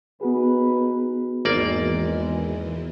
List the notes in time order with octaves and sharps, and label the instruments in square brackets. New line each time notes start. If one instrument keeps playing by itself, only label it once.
[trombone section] D#2 D#4 B4 [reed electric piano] B3 F#4 G#4
[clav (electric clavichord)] G#1 A#3 D5 [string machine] E2 E3 [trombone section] G#3